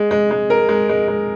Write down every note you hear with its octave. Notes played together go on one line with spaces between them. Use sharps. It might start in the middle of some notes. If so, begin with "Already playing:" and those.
Already playing: G#3
G#3
G#3
A#4
G#3
G#3
G#3